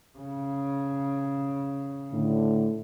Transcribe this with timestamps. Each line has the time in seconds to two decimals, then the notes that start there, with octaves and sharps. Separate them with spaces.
0.19 C#3
2.12 A2 D3